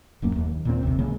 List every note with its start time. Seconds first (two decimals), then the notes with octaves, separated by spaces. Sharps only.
0.22 D1 F#2 A#3
0.36 D#2
0.65 A#2 C4
0.83 A#1 D#2 C3
0.99 B1 C#3 G#3 A#3